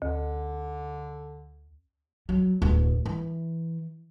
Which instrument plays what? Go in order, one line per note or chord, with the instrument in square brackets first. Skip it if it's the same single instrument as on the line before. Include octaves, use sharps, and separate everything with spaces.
[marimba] D2 [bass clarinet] D3
[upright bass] F#3
D1
E3